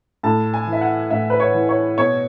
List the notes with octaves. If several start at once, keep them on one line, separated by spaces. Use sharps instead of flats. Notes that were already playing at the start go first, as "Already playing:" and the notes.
A2 A5
G#5
E3
E5
F#5
A2 E5
B4
C#5
E3
C#5
B2 C#5